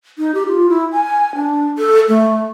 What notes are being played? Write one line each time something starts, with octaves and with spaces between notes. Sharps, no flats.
D#4
G4
F4
E4
G#5
D4
A4
A3